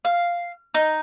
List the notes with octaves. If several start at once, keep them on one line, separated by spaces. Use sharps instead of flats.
F5
D#4